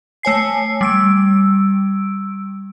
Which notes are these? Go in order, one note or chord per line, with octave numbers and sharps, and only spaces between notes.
A3 C#5 G#5 C7
G3 E6 D7